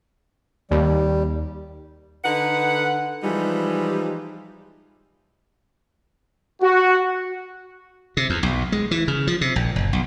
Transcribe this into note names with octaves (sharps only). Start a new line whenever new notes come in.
D#2 G3
D3 D#4 B4 F#5
E3 F3 G3 G#3 D#4 E4
F#4
C3
E2
B1
G#3
E3
C#3
F3
C3
A#1
F#1
B1